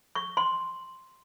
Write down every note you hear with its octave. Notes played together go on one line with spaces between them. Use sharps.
C#6
C6